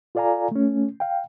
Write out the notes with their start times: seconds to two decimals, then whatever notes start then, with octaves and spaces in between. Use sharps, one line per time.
0.15 F4 A4 D5 F5 G#5 A#5
0.51 A3 C#4
1.00 F5 G5